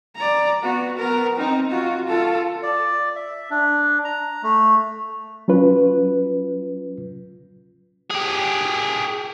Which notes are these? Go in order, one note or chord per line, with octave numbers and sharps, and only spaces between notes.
D5 A#5
B3 F#4
B3 A#4
C4 D#4
F4 F#4
F4 A4
D5
E5
D4
A#5
A3
F#3 C#4 F4 B4
G4 G#4